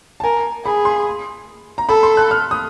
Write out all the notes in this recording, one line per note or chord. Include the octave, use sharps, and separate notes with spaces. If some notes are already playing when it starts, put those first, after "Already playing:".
A5
A#4 G#5
G#4 B5
C6
A#5
A4 B5
C6
F#6
F6
D#6